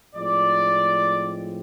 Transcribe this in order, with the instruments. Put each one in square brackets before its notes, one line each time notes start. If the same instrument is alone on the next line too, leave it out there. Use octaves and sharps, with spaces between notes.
[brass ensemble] A2 F3 G#3 C4 D5